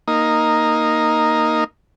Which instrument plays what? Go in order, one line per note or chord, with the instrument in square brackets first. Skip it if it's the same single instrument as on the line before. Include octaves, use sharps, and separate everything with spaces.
[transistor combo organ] A#3 D#4